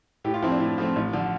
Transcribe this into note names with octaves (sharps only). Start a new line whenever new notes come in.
A2 G4
F4
F3 A3 C4 E4
D4
A2
F3 A3 C4
A1
D3 F3